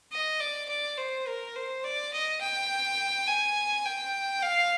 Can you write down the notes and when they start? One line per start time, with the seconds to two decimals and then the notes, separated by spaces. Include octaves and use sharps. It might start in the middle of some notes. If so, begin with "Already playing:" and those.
0.12 D#5
0.40 D5
0.69 D5
0.98 C5
1.27 A#4
1.56 C5
1.84 D5
2.13 D#5
2.41 G5
3.28 G#5
3.85 G5
4.42 F5